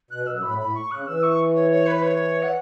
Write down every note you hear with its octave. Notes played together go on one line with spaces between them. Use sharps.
B2 F#6
F#2 E6
A2 B5
A2 B5
C#6
C#3 F#6
E3 E6
C#6
C#5
C#5
B4
C#5
F#5